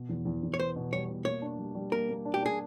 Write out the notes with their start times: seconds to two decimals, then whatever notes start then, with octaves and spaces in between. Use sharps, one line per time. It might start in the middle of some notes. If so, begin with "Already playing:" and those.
Already playing: B2
0.09 E2
0.25 E2
0.43 E2
0.54 C#5
0.59 B3 C5
0.76 B2
0.92 G3 C#5
1.09 B2
1.25 A#3 C#5
1.42 D4
1.59 G3
1.75 G3
1.92 A#3 A#4
2.09 A#3
2.25 D4
2.34 G4
2.42 D4 G#4